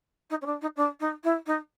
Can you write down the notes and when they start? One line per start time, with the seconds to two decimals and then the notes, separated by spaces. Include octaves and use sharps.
0.30 D#4
0.41 C#4
0.46 D4
0.61 D#4
0.76 D4
1.00 D#4
1.24 E4
1.46 D#4